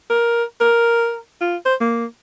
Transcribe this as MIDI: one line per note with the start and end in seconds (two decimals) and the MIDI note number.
0.10 0.44 70
0.61 1.17 70
1.41 1.57 65
1.66 1.75 72
1.81 2.05 58